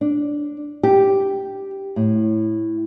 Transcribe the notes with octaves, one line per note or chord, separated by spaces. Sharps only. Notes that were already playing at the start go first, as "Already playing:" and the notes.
D4
G4
A2